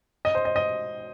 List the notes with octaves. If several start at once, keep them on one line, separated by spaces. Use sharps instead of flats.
D#5
C5
D#5
D#5